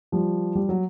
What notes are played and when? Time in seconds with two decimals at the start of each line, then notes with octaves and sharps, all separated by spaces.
0.12 F3 G3
0.55 G3
0.69 F#3